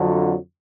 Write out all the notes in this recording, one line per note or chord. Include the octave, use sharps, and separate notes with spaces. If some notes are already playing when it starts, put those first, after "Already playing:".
Already playing: F2 D3 F#3